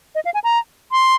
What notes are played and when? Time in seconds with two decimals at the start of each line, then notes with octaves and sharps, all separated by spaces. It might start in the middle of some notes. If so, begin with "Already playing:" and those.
0.15 D#5
0.25 F5
0.34 G#5
0.44 A#5
0.92 C6